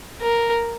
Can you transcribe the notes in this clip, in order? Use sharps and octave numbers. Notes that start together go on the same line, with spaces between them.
A#4